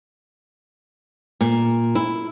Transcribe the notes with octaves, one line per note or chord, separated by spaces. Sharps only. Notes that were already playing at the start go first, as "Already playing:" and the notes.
A#2
E4